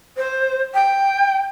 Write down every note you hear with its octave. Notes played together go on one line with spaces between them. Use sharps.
C5
G5